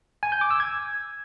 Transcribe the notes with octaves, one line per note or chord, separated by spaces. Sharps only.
G#5
G6
D6
E6
G#6